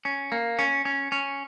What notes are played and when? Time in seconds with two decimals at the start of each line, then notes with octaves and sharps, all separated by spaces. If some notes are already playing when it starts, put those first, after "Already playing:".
0.05 C#4
0.32 A#3
0.59 C#4
0.85 C#4
1.12 C#4